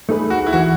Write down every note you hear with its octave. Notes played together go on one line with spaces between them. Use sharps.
A3 D#4 G#4 B4
F#4
E4
E3 F#4